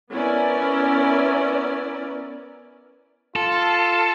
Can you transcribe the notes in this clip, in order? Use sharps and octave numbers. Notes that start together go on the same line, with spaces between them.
B3 C#4 E4 A#4 D5
F4 A4